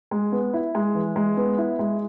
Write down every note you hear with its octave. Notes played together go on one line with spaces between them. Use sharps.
G#3
B3
E4
G#3
E3
G#3
B3
E4
G#3